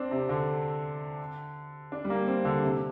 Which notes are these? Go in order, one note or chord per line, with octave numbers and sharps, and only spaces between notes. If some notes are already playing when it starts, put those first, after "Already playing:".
Already playing: C4 D4
C3
D3
D4
G3
A#3
C4
D3
C3